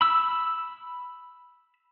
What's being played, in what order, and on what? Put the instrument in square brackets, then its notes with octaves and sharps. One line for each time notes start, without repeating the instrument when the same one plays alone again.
[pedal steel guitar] B5 E6